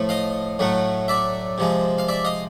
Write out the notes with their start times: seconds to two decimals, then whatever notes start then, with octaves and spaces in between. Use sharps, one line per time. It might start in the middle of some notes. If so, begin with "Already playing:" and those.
Already playing: A2 F3 A3
0.09 D#5 F5
0.59 A2 F#3 A3
1.08 D5 E5
1.58 C3 F3 G#3
1.98 F5
2.09 D5 E5
2.25 D#5 F5